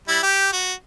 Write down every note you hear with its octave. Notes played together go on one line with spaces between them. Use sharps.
G3 E4
G4
F#4